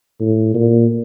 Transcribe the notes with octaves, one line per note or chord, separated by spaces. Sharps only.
A2
A#2